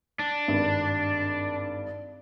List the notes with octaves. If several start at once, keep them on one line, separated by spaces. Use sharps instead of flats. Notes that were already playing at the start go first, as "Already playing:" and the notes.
D4
G#1 G2